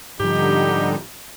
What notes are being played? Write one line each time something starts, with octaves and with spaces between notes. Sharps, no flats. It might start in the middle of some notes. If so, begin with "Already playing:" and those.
G#2 D3 F3 G3 D#4 G4